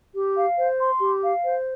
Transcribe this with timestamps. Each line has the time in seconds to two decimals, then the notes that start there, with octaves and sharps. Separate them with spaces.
0.14 G4
0.36 F5
0.58 C5
0.79 C6
1.00 G4
1.22 F5
1.43 C5